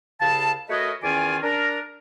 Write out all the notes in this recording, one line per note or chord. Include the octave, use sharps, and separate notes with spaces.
C2 C#3 F5 A5
A3 F#4 A#4 B4 C#5 D#5
E2 D#3 C#4 F4 D5 G#5
D4 A#4